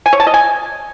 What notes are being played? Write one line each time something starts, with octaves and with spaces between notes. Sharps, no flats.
G#5
C#5
A5
D#5
G#5